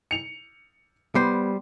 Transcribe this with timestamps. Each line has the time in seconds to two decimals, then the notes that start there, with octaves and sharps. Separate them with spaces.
0.11 C#7 F7
1.15 G3 B3 C5